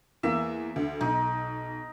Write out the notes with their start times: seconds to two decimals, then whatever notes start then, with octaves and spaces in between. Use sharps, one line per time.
0.23 E2 A#3 E5
0.76 D2
1.01 B1 D#4